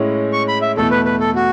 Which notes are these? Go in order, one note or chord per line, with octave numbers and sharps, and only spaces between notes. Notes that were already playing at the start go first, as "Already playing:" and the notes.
Already playing: A2 G#3 C#4 E4
C#6
B5
E5
E2 B2 A3 E4 A4
B4
B4
A4
F#4